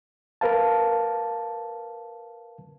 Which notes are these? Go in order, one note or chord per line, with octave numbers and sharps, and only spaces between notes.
A#4 B4 F5 A5